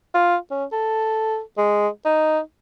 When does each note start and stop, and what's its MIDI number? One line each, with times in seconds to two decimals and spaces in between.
0.14 0.37 65
0.51 0.64 61
0.72 1.41 69
1.58 1.88 56
2.05 2.39 63